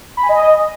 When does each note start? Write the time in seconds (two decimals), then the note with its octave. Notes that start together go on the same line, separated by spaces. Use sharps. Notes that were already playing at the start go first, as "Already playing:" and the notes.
0.17 B5
0.23 G#5
0.29 D#5